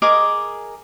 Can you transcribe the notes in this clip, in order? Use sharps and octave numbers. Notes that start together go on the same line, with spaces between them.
G#4 A#4 D#5 D6